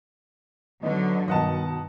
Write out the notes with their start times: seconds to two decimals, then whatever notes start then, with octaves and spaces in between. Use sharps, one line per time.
0.83 D3 F#3 B3 D#4
1.28 G2 B2 D#3 D#5 F#5 A5